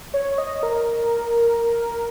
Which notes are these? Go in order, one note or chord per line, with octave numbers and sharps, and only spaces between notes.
C#5
D#5
A#4